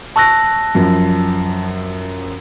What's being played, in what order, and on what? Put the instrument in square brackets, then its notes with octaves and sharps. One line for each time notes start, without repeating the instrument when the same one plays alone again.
[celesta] A5 E6 A#6 [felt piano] C#6 F#6
[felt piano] F#2 F3